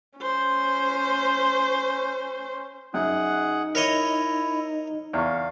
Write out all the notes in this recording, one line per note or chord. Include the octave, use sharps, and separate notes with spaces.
C#4 C5
F#2 D#4 G#4 F#5
E4 A#4 C#5 D#5
E2 F5 C#6